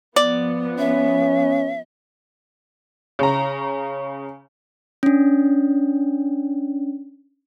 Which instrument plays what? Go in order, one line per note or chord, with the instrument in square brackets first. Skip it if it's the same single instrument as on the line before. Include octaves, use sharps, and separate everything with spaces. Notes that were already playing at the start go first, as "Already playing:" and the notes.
[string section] F3 B3 [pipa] D5
[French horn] C#4 [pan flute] E5
[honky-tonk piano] C#3 A#5
[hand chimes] C#4 D4